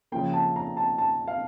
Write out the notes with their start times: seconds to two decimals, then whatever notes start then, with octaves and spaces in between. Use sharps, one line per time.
0.12 C#3 F3 A#3 G5
0.34 A5
0.56 A#5
0.77 A5
0.98 A5
1.28 F5